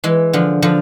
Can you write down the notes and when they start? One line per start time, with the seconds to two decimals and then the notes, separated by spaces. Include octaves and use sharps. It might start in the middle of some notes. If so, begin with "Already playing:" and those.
0.04 E3 G#3
0.33 D3 F3
0.62 D3 F3